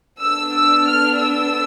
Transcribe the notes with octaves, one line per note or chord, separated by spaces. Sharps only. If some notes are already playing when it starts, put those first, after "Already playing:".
B3 D4 A4 E6
E6
F6
E6